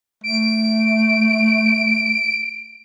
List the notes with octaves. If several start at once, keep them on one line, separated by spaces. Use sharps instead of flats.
A3 D7